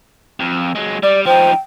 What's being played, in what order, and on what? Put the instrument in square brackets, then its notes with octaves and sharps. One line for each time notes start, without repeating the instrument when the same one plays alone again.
[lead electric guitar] F2
F#3 G#3
[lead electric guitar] G3 [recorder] D5
[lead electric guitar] F3 D#4 [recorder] C5 [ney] G5